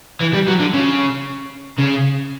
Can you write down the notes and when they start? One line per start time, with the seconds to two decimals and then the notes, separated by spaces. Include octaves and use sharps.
0.20 E3
0.33 G3
0.48 F#3
0.60 D3
0.74 C#3
1.78 C#3